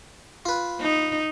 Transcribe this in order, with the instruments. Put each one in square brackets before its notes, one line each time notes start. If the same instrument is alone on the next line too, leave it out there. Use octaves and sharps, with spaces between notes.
[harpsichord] F4 B4
[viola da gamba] D#4